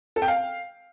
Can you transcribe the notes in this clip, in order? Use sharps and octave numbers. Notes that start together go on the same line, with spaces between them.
A4
G5
F5